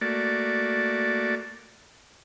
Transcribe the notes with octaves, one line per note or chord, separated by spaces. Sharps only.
A3 A#3 F#4 D5